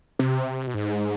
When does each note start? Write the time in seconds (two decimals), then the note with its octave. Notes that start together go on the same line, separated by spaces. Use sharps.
0.19 C3
0.67 B2
0.74 G#2